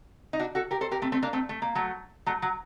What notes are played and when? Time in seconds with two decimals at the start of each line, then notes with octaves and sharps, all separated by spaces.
0.33 D#4
0.39 D4 F#4
0.55 F#4 A4
0.71 G4 A#4
0.81 A4 C5
0.91 G4 A#4
1.02 A3 C4
1.12 A3 C4
1.22 A#3 D4
1.33 A3 C4
1.49 A3
1.62 A#3
1.75 F#3 A3
2.26 F#3 A3
2.42 F#3